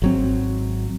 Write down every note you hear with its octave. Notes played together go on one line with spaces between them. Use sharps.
G#1 F#3 C4